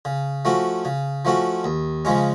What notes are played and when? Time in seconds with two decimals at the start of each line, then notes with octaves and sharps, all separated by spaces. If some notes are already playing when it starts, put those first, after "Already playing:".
0.05 C#3
0.45 F3 A3 C#4 F#4
0.85 C#3
1.25 F3 A3 C#4 F#4
1.64 D#2
2.05 C#3 F3 G#3 C#4